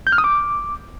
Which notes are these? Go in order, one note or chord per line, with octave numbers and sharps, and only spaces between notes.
G6
F6
D#6
D6